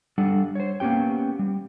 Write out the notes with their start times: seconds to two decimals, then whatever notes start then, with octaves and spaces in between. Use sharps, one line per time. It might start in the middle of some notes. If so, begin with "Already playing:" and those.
0.18 G3 D4 A4 F#5
0.55 C5 C#5
0.80 A#3 B3 C#4 G4 G5
1.39 G3